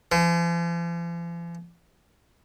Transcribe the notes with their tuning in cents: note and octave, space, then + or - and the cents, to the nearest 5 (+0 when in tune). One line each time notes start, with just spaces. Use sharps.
F3 -45